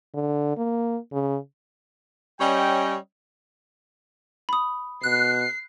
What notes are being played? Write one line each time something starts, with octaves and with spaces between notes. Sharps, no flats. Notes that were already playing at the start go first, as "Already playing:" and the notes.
D3
A#3
C#3
G3 C#4 C#5 D#5 G5
B5 D#6
B2 F#6 C7